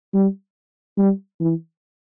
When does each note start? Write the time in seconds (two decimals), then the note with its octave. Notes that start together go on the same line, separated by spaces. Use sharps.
0.14 G3
0.98 G3
1.40 E3